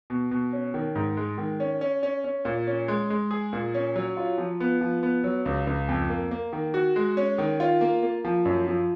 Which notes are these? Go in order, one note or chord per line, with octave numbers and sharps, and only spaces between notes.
B2
B2
C#4
D#3
G#2
G#3
D#3
C#4
C#4
C#4
C#4
A#2
C#4
G#3
G#3
G#4
A#2
C#4
F#3
F4
F3
B3
F3
B3
F#3
C#2
C#2
F2
A#3
A#3
D#3
F#4
G#3
C#4
D#3
F4
A#3
A#3
F3
F#2
F3